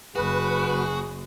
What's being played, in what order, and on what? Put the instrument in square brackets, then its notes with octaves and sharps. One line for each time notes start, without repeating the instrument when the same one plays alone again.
[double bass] F#1 F#2 [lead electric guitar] F#4 [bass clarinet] G#4 [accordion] B4